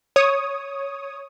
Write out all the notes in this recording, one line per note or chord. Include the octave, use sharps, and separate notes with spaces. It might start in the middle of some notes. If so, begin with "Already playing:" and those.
C#5 D#6